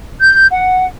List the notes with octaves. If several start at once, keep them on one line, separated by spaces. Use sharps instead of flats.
G6
F#5